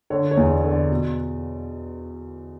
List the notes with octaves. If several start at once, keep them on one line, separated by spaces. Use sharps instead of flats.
D3 C#5
C#5
E2
D5
D3
D5
B2